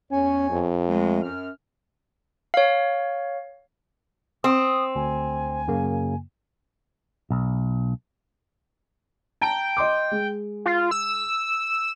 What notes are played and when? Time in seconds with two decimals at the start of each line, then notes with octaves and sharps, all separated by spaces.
0.11 E2 C#4 C#5 G#5
0.50 F2
0.89 G#3 A3
1.22 F#2 F6
2.54 C#5 F5
4.44 C4 D#6
4.95 D2 G#5
5.68 F#2 C#3 A#3
7.30 B1
9.41 G5 A5 A#5 D7
9.77 D#5 C6 D6
10.11 G#3
10.66 F4
10.91 E6